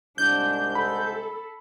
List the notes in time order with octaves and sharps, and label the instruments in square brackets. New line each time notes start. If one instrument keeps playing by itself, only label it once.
[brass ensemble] C2 G#2 [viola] D4 [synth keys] G6
[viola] A4 [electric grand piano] B5